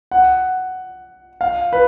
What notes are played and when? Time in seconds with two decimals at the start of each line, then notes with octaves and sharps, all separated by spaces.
0.11 F#5
1.41 F5
1.73 B4